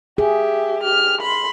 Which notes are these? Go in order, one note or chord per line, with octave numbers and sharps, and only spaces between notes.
G4 G#4 E5
G4 F6
B5 C6